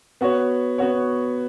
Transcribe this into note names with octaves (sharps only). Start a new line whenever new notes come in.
B3 F#4 C#5
B3 F#4 C#5